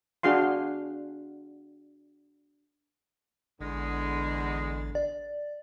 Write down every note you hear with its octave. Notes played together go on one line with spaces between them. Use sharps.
D4 F#4 G#4 F5 C6
A1 E2 D3 G#3
D5